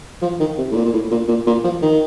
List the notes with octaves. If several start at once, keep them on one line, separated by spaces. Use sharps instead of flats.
F3
D#3
C3
A2
A#2
A#2
A2
A#2
A#2
A#2
F3
D#3